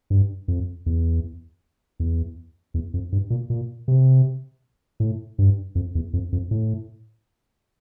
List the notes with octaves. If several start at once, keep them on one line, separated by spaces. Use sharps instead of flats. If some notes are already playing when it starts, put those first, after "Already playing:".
G2
F2
E2
E2
E2
F2
G2
A#2
A#2
C3
A2
G2
F2
E2
F2
F2
A2